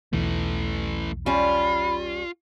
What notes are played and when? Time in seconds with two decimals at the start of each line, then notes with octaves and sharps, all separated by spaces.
0.13 B1 E2 E3 A3
1.26 G3 C#4 F4 B5